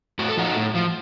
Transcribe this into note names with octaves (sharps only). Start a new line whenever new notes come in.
A2 F#4
A4
F3 D#4 F#4
A2
F3